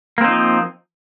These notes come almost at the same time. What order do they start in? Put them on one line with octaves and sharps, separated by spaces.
A#3 C4 D#4 F3